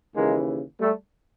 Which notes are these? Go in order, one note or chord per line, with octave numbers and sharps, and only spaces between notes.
D#2 C#3 E3 G#3 A#3
G3 A3